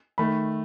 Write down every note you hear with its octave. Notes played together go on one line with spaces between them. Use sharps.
D#3 A3 B5